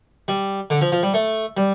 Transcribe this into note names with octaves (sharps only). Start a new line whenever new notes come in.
G3
D3
F3
F3
G3
A3
G3